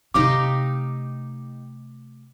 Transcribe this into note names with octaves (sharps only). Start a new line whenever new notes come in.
C3 A3 D#4 G4 F5 D6